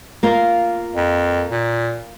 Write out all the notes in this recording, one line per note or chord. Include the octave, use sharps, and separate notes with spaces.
A#3 F4 A#4
F2
A#2